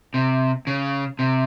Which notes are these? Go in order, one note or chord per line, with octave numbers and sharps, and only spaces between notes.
C3
C#3
C3